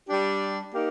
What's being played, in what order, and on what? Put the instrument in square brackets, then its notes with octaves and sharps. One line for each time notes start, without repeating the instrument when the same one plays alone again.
[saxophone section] G3 D4 G4
A#3 D#4 G4